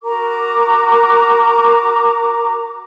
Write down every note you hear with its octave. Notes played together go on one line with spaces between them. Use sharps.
F#4 A#4 A#5 D6